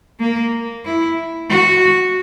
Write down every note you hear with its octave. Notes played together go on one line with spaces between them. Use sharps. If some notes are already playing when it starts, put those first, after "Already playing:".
A#3
E4
F#4